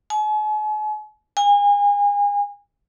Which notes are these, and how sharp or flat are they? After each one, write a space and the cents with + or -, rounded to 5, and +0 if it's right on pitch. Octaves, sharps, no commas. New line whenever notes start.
G#5 +45
G#5 -35